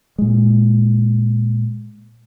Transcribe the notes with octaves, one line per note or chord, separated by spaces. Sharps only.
A#2 G#3